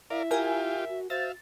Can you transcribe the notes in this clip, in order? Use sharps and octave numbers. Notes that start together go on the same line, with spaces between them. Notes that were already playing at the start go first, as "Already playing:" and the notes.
E4 A#4 D5 E5 F5
F4 G4 A#4 G#5
F#4
F#4 C5 E5 F5 A6